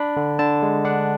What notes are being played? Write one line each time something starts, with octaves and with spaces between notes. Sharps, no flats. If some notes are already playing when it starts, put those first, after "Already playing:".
Already playing: D4 B5
D3
D3 A5
G#3
D4 F#5